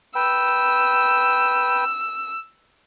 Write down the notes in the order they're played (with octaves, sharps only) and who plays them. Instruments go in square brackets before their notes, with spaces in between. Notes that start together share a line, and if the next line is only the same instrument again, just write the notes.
[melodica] B4 G5 [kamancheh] E6